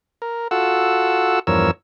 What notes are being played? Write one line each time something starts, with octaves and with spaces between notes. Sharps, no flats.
A#4
F4 F#4 A4 F#5 E6
E2 G2 F3 A#4 C#5 E6